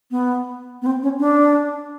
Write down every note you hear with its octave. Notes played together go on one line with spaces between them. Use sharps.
B3
B3
C4
C#4
D4